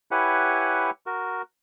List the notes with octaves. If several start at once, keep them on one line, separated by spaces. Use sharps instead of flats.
E4 G4 B4 C#5 F#5 G#5
F#4 A#4